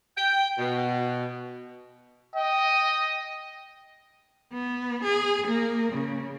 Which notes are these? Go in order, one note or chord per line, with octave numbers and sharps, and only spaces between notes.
G5
B2
D#5 G5
B3
G#4
A#3
C#3